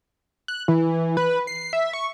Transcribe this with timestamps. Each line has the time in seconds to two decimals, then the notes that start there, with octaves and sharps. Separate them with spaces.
0.48 F#6
0.68 E3
1.17 B4
1.47 C7
1.73 E5
1.93 C#6